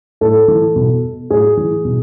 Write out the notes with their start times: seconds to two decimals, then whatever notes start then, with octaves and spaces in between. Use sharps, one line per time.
0.21 A2 A4
0.48 E3
0.76 B2
1.30 A2 G#4
1.57 E3
1.85 B2